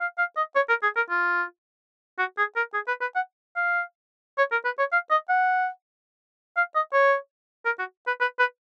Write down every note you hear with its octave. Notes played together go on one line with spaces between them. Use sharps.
F5
F5
D#5
C#5
A#4
G#4
A#4
F4
F#4
G#4
A#4
G#4
B4
B4
F#5
F5
C#5
A#4
B4
C#5
F5
D#5
F#5
F5
D#5
C#5
A#4
F#4
B4
B4
B4